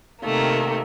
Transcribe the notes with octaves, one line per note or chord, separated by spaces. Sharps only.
C3 D#3 A3 A#3